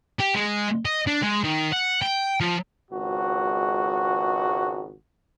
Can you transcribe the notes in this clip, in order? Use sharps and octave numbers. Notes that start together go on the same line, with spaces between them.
G4
G#3
D#5
D4
G#3
D#3
F#5
G5
F3
G#1 C#2 F#4